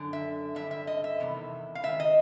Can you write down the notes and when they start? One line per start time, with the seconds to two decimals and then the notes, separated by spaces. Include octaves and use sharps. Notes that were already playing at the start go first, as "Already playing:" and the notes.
Already playing: F#2 D3
0.13 E5
0.56 G2 D3 E5
0.71 E5
0.87 D#5
1.04 E5
1.20 E2 C3 D#3
1.75 F5
1.83 G#2 D#3 E5
2.00 D#5